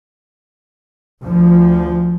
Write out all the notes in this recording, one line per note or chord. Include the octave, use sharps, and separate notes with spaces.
D2 F3